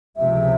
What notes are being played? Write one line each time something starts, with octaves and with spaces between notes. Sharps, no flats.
C#2 C3 F3 G#3 E5